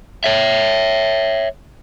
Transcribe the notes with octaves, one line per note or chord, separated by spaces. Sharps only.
C#5 E5